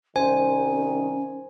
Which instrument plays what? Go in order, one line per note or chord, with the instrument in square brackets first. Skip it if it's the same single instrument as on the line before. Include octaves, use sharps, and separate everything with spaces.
[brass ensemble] C2 D#3 [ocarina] C#4 [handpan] C5 [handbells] G#5